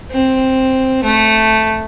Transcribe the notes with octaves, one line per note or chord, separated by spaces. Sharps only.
C4
A3